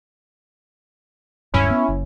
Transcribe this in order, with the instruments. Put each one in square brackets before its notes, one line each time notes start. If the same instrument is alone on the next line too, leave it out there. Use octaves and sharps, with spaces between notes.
[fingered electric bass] D1 G2 [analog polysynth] C#4 E4
[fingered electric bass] B3
F#1